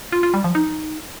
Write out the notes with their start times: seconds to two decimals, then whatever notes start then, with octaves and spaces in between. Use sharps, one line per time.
0.12 F4
0.23 F4
0.34 G3
0.44 F3
0.55 D#4